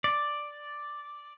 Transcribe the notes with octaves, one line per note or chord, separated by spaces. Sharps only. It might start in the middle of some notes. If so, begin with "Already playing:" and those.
D5